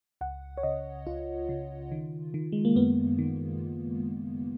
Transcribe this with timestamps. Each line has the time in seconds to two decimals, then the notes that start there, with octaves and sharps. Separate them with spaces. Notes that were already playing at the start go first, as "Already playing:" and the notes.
0.21 C#2 F#5
0.58 C#5
0.63 C#3 D#5
1.07 C#2 F4
1.49 C#3
1.92 D#3
2.34 D#3
2.52 G#3
2.65 A#3
2.76 F#2 B3
3.19 D#3